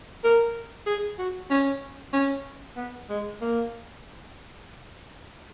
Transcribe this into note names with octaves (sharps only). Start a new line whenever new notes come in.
A#4
G#4
F#4
C#4
C#4
B3
G#3
A#3